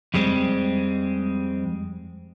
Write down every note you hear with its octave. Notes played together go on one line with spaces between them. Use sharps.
F2 G3 G#3 C4